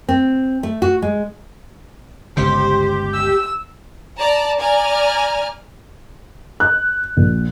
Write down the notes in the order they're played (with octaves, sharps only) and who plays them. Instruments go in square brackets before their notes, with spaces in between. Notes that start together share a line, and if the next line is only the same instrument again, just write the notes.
[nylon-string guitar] C4
A3
F#4
G#3
[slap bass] G1 C#2 B2 [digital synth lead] G4 [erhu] C5
[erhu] E6
[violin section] D5 A5 A#5
D5 G#5 A#5 F6
[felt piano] F#6
A#1